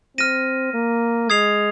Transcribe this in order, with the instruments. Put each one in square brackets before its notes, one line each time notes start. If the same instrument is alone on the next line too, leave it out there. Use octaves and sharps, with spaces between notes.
[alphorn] C4 [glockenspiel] F6 A#6 D#7
[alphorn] A#3
[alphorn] G#3 [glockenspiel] D#6 G#6 C7 F7